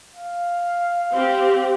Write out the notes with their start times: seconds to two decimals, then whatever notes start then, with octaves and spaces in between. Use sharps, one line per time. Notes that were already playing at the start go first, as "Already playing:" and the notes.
0.15 F5
1.14 C4 G4